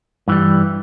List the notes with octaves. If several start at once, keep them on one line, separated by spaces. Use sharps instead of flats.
G2 E3 G3